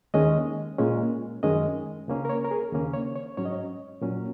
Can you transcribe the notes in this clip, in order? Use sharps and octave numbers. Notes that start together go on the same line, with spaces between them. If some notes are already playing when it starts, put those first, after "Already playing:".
D#2 D#3 G#3 C#4 D#5
A#2 G#3 C#4
F#2 D#3 G#3 C#4 D#5
C#2 C#3 A#3 C#4
A#4
C#5
A#4
G#4
D#2 C#3 A#3 C#4
C#5
C#5
G#2 F#3 C#4 C#5
D#5
C#5
A#2 F#3 C#4